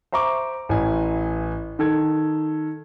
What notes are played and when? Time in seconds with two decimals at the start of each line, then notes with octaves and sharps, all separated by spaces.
0.12 C5 E5 A#5 C#6 D6
0.69 A1 E3 G#5
1.79 D#3 A4 G#6